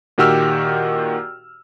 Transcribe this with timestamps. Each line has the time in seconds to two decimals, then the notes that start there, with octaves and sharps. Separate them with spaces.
0.18 A#2 D#3 F#4 G4 E6 F6